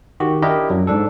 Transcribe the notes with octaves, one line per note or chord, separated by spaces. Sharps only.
D#3 F#4 G4
D4 E4 G4 A#4 D#5
F#2 F#3
G#2 D4 A4